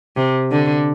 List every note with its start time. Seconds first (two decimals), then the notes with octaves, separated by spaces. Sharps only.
0.16 C3
0.51 D3